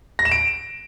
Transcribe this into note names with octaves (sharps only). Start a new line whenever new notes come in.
A#6
E7
D7